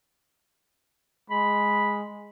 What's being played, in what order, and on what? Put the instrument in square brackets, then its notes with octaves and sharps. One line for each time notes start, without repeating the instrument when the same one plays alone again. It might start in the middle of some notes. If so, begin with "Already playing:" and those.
[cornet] G#3 [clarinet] B5